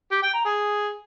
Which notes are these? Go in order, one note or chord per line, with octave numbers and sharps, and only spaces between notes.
G4
G5
A#5
G#4